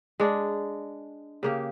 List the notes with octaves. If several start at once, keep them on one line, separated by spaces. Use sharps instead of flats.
G#3 D4
C#3 A#3 G4